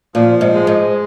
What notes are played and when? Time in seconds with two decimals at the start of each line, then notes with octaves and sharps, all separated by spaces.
0.15 A#2 F3
0.41 G#2
0.55 G#3
0.67 G#2